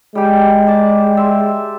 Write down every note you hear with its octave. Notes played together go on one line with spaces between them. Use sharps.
G3 G#3 G4
D5 A5
E5 C6